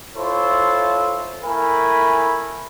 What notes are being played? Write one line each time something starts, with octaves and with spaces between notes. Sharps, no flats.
E4 F4 A4 C5 C#5 E5
A3 E4 A#4 G#5 B5